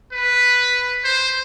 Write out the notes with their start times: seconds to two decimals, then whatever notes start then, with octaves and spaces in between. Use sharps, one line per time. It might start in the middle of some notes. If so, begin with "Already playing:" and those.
0.13 B4
1.04 C5